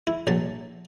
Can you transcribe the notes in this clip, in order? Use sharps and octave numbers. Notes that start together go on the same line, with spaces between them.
E4
A#1 F#3 A5